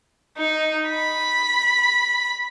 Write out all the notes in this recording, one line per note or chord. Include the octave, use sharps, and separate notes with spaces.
D#4
B5